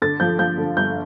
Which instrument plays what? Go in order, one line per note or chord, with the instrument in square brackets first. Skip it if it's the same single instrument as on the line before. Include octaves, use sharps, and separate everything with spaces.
[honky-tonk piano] D3 [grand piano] A6
[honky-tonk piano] F3 [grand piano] G6
[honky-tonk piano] F3 [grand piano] G6
[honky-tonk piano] D3
[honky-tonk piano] G1 [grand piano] G6